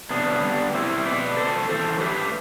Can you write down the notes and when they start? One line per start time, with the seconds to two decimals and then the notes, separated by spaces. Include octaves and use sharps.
0.10 C3 B3 D4
0.43 G3
0.74 G3 C4 E4
1.06 B2 B4 D5
1.37 C3 A4 C5
1.69 E3 A4 C5
2.00 A3 G4 B4